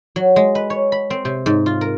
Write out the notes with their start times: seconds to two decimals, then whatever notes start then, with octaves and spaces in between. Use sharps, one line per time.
0.16 F#3
0.36 G#3
0.55 B4
0.70 C#5
0.92 B5
1.10 C4
1.25 C3
1.46 G#2
1.66 F4
1.81 A#4